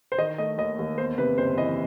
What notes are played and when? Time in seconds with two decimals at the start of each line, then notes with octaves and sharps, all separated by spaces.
0.12 C5
0.18 D#3 D#5
0.38 A3 D#5
0.58 D#2 D#5
0.79 D#2
0.98 E2 C5
1.18 C3 B4
1.38 F#1 C5
1.57 E3 D#5